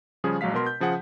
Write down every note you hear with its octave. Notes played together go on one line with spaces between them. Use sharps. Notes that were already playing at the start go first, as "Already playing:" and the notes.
C#3 F3 G3 C#4 G#4
A#1 F#3 G#3 F5 B6
B2 A#4 C6
G6
C#3 F3 G#4 F#5